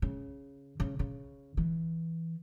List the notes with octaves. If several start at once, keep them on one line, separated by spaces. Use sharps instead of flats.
C#3
C#3
C#3
E3